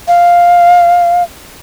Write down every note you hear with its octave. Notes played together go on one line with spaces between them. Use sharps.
F5